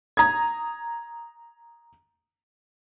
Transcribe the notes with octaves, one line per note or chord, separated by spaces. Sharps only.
A#5 D#6 G#6